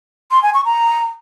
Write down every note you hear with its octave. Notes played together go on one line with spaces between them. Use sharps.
C6
G#5
C#6
A#5